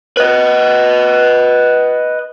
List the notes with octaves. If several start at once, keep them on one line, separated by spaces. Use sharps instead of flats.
B4 D#5